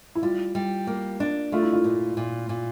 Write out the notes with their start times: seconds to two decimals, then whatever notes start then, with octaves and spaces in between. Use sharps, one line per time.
0.15 E4
0.22 G3 F4
0.55 G3
0.87 A#3
1.20 D4
1.52 A3 F4
1.62 E4
1.73 F4
1.84 A#2
2.17 A#2
2.49 A#2